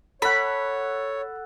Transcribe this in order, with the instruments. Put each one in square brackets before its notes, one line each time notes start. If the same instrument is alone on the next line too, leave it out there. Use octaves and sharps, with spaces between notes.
[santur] A4 F#5 [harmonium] C#5 [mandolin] B5